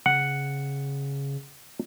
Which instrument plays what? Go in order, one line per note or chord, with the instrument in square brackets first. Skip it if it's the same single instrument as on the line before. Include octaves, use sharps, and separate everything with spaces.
[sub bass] C#3 [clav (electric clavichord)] F#5